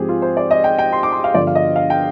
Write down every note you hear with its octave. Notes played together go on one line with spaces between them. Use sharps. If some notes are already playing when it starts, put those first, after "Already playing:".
Already playing: G#2 F3 G#3 C4 G4 G#4
F4
C5
D5
D#5
G5
G5
C6
D6
C6
F5
G2 D3 F3 B3 D5
F5
D#5
F5
G5